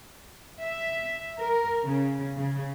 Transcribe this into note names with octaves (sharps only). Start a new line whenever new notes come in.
E5
A#4
C#3
C#3